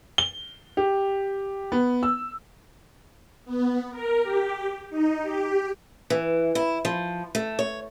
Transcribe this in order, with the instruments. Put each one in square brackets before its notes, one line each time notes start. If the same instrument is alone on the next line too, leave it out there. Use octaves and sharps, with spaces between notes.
[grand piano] G7
G4
B3
E6
[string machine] B3
A#4
G4
D#4
G4
[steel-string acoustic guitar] E3
E4
F3
A3
C#5